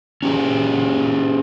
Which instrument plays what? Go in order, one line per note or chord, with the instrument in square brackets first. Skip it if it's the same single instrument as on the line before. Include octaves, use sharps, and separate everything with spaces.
[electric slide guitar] C#4 F4 G4 G#4